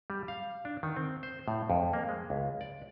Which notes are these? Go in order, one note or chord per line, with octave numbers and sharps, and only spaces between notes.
G3
F5
D4
D#3
C4
C5
A2
F2
A#3
G#3
C#2
D5